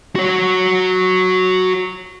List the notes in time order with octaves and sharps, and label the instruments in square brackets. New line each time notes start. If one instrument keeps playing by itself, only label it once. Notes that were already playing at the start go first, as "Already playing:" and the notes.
[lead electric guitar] F#4 C#5